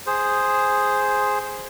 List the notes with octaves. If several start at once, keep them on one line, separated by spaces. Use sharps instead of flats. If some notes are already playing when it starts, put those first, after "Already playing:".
G#4 C5